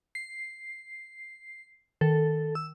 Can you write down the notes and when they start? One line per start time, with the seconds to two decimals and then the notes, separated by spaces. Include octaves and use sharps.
0.15 C7
2.01 D#3 A4
2.55 E6